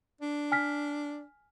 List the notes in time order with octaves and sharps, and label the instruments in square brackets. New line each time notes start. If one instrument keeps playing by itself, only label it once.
[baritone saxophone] D4
[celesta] G#5 F6 B6